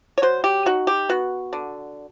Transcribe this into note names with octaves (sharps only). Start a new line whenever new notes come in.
C#5
F#3 C5
G4
D#4 F#4
G4
B3 F#4
D3